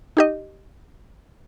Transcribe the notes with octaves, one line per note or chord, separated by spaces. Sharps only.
D#4 G4 D#5